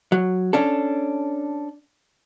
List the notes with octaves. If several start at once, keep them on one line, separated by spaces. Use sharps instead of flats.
F#3
C#4 D4 A4